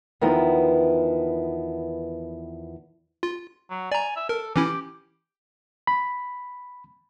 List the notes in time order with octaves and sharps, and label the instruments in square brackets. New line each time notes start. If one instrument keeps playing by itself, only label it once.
[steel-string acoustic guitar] E2 D#3 F3 B3 E4
[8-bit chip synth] F4
[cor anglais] F#3
[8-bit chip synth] D5 A#5 [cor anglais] G#5
[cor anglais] E5
[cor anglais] A4 [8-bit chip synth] A#4
[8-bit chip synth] E3 C#4 E4 [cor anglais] G4
[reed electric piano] B5